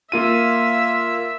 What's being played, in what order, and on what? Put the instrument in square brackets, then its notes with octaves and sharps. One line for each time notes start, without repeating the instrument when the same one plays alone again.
[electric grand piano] A#3 F4 D#7 [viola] E5